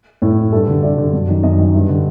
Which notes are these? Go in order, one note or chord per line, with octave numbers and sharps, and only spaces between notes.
A2
G2 A4
D3
G2 D5
D3
F#2
D#3
F#2 D#5
D#3
G2
D3